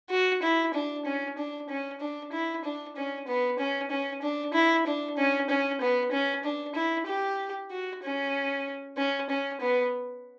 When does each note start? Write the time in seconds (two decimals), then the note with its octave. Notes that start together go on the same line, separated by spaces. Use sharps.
0.10 F#4
0.42 E4
0.74 D4
1.05 C#4
1.38 D4
1.69 C#4
2.00 D4
2.32 E4
2.64 D4
2.96 C#4
3.27 B3
3.59 C#4
3.90 C#4
4.22 D4
4.54 E4
4.86 D4
5.18 C#4
5.49 C#4
5.81 B3
6.12 C#4
6.44 D4
6.75 E4
7.07 G4
7.71 F#4
8.03 C#4
8.97 C#4
9.30 C#4
9.61 B3